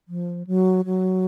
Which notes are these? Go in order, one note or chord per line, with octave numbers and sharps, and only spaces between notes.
F3
F#3
F#3